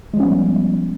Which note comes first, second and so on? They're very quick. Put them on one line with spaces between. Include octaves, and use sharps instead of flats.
G#3 F3 C#4 B3 G3